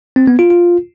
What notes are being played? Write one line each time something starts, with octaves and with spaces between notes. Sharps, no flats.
C4
B3
F4
F4